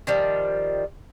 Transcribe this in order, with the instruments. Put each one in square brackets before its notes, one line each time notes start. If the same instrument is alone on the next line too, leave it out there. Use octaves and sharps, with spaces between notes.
[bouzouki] D#3 F3 G3